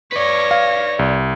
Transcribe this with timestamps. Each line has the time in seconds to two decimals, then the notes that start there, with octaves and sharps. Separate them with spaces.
0.13 B4 C#5 D5 A#6
0.51 F5
0.99 C2